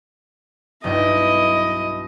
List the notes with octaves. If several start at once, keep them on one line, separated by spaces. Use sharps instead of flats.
B1 G2 E4 D#5 G5